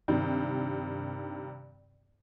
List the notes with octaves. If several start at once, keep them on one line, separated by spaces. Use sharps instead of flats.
G2 C3 D#3